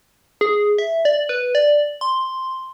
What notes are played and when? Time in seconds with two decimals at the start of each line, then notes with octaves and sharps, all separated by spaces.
0.41 G#4
0.78 E5
1.05 D5
1.29 B4
1.55 D5
2.01 C6